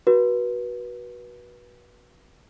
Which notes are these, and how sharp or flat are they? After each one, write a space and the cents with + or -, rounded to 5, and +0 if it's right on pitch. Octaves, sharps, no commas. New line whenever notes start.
F#4 +10 B4 -25